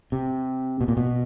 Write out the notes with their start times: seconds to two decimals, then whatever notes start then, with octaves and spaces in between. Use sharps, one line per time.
0.12 C3
0.81 B2
0.88 A#2
0.97 B2